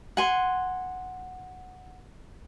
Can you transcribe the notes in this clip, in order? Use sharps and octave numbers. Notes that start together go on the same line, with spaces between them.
F#5 G#5 C6